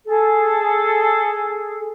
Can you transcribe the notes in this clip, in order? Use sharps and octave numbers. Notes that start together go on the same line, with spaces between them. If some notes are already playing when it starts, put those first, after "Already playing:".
G#4 A4